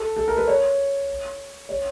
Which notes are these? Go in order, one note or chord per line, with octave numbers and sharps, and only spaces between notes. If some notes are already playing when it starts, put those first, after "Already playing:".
Already playing: A4
A4
A#4
B4
C#5
C#5